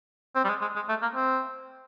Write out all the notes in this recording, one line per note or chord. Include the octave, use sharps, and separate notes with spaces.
C4
G3
G#3
G#3
G#3
A3
A#3
C4